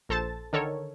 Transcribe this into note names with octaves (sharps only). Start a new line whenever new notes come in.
A#1 A4 C5 A5 A6
D3 D#3 A4 A#4 C#5